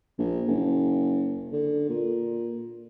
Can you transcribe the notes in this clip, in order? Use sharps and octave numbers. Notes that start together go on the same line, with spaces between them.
A#1
F#1
D3
A#2